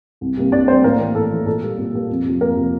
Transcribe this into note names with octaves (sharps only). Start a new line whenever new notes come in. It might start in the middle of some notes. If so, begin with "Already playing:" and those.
C2
C3 G3 A#3
C2 D4 D5
C3 G3 A#3 C4 C5
A2 A#3 A#4
E3 A#3
A2 A4
E3 A#3
A#2 A4
G3 A#3
A#2
G3 A#3
F2
C3 F3
F2 A#3 A#4
C3 F3